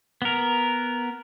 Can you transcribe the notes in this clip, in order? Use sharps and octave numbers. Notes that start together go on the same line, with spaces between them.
B3 A#4